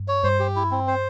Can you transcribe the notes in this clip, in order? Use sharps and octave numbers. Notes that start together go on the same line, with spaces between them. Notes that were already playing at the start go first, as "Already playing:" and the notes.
Already playing: G2
C#5
G2 C5
G4
E4
C4
C5